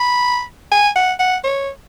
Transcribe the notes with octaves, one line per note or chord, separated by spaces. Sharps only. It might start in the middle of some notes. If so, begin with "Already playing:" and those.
Already playing: B5
G#5
F#5
F#5
C#5